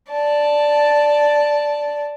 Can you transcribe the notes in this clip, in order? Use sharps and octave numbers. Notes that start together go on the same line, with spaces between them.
D5 A5